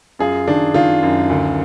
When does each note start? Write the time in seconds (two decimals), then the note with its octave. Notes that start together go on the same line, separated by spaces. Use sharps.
0.19 F#2 F4 G#4
0.48 D#3 D4
0.74 D#3 D4 F4
1.03 F#2
1.30 D2